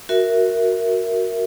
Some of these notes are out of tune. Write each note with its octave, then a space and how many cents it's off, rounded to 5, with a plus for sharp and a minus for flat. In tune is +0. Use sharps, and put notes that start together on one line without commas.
F#4 +0 A#4 -5 E5 +0